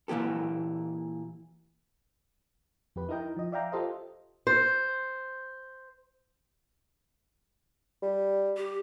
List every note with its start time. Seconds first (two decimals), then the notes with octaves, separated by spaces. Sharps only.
0.08 A#2 E3 A#3 G4 A4
2.96 F2 G4 B4
3.09 D#4 E4 A#4 D#5 G5
3.37 F3 D#5
3.52 D5 E5 F5 G5 A#5
3.72 F4 G4 A4 C5 D#5
4.47 C5
8.02 G3
8.57 G4